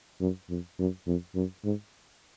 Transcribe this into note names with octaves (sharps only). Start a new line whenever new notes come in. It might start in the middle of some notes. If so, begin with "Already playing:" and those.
F#2
F2
F#2
F2
F#2
G#2